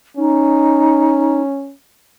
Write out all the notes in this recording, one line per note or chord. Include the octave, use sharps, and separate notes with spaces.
C#4 D#4